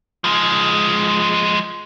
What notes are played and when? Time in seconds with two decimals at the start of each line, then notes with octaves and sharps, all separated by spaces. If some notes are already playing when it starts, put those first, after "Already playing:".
0.24 F3 G#3